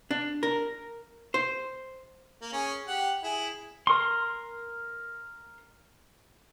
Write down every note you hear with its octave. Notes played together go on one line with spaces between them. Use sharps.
D4
A#4
C5
A#3
C#4 G#4
G4 F#5
E4 G#4
A#4 C6